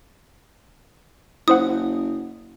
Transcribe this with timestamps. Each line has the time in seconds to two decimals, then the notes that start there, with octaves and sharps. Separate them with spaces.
1.48 F#1 E4 C5 F#5 D#6